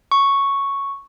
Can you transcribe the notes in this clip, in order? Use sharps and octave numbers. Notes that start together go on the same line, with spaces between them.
C#6